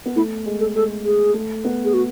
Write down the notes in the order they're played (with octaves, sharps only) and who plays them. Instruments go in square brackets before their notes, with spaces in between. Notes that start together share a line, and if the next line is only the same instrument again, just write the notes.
[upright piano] B3
[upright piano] A3 [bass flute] E4
[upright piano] G#3
[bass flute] A4
[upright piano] G#3 [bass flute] A4
[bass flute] G#4
[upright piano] A3
B3
[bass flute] G#4
F#4